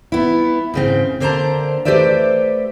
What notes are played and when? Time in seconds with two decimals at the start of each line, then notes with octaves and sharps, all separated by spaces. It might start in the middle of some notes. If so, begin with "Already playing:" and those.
0.12 B3 E4
0.74 G#2 C#3 C4
1.20 D3 A#3 C5 G5 A5 A#5
1.85 A3 G4 B4 C5 D5 E5